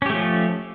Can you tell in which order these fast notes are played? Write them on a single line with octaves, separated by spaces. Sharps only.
C#4 G4 A3 F3